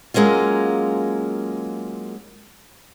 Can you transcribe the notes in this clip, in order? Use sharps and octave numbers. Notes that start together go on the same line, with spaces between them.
F#3 G#3 A#3 C#4 F4